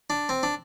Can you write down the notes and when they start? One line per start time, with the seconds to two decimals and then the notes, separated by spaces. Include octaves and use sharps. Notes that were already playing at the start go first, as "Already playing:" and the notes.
0.10 D4
0.29 C4
0.43 D4